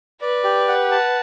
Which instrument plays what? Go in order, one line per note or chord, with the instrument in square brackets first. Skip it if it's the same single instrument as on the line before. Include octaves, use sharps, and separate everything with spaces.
[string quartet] B4 [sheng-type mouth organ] D5
[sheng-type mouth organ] G4
F#5
A5